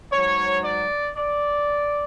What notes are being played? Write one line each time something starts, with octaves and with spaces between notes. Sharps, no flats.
G#2 F#3 C#5
D5
D5